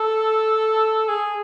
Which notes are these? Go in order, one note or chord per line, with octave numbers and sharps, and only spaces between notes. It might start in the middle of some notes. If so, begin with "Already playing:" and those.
Already playing: A4
G#4